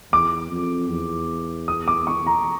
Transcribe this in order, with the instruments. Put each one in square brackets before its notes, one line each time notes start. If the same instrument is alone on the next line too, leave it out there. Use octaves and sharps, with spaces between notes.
[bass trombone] E2 [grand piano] D6
[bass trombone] F2
E2
[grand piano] D#6
D6
C#6
A#5